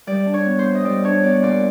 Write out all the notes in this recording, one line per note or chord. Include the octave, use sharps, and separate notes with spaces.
G3 D5
D4
C#5
B3
C5
A#2
D#5
G3 D5
D4 C#5
B3 D5
A#2 D5